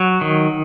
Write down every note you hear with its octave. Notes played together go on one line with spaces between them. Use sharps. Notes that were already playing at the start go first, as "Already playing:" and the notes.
Already playing: F#3
D#3